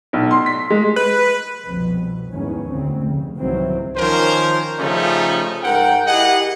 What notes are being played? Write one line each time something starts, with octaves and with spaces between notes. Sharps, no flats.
B1
C6
B6
G#3
B4
C2 F2 B2
E2 G#2 D#3 B3 C#4
D2 C4
F1 C#3
C2 G#2 D#3 E3 F#3 C4
D#3 F3 C#4 A#4 C5
C#3 F3 G3 A3 C#4 D#4
G#2 A#4 F#5 G5
E4 G4 G#4 D#5 F#5